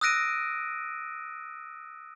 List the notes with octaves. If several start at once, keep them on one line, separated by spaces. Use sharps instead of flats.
D#6 E6 F#6 A#6 D7 D#7